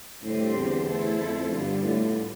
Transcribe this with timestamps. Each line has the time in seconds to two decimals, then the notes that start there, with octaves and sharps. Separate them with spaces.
0.23 A2 D3 G3 C4 G4 C5
0.56 E2
0.88 A3 E4 A4 C5
1.20 F2
1.51 G2 D3 G3 B3 F4
1.84 A2